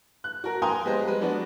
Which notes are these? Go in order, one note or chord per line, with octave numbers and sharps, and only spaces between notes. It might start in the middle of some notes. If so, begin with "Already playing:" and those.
F#6
F#4 A#4
F5 G5 G#5 A#5 C6 D#6
G#3 B3 G4 C5 D#5
G3 G#3 B4
F#3 B3 D4 F#4